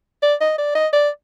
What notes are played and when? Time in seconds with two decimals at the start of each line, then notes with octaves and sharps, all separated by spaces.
0.22 D5
0.41 D#5
0.58 D5
0.75 D#5
0.93 D5